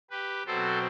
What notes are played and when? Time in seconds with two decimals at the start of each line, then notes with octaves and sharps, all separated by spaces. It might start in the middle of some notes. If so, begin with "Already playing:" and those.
0.10 G4 B4
0.46 B2 F#3 C4 A4 C5